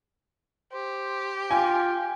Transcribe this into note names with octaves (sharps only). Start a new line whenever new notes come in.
G4 C5
F4 G5 G#5